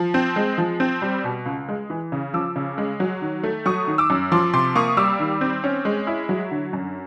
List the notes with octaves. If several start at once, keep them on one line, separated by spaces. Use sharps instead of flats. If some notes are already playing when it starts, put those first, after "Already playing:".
Already playing: F3
C4
G#3
F3
C4
G3
B2
C#2
G#3
E3
C#3
F3 D6 E6
C#3
G#3
F#3
D#3
A3
F#3 C#6 D#6
D#3
D6 E6
F#2
F3 C6 D6
C3 C6 D6
A#3 C#6 D#6
G3 D6 E6
D#3
C4
C#4
G#3
E4
F#3
D3
F#2